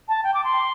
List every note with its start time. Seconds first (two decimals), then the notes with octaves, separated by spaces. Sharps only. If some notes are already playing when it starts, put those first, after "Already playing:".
0.08 A5
0.24 G5
0.34 D6
0.44 C6